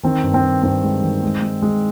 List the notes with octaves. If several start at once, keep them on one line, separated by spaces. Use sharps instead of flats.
D#3 C4
G2
C4
G2
G2 C4
G#3
D#3
G#3
G#3
G#3